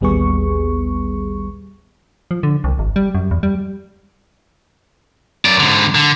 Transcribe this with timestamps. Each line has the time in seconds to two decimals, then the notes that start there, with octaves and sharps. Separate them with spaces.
0.01 A1 D#2 G3 B3 G#4 C#6
2.31 F3
2.43 D3
2.64 C2
2.79 G#1
2.96 G3
3.15 F#2
3.31 E2
3.43 G3
5.45 F#2 D5
5.60 G#2 D3
5.95 D3